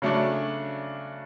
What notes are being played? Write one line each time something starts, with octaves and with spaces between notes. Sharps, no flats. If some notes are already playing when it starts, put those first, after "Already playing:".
C#3 F#3 A3 D4